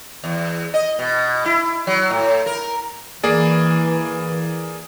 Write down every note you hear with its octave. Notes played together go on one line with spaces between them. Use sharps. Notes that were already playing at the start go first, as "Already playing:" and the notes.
E2
D#5
B2
E4
F#3
A2
A#4
E3 A#3 G#4 D5